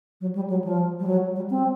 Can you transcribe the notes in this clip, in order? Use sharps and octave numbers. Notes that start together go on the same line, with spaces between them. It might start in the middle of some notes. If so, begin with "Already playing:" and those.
F#3
G3
F#3
F3
G3
F#3
G3
C4